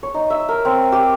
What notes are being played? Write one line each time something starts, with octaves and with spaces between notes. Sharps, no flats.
C#5
D#4
E5
A#4
C4
G4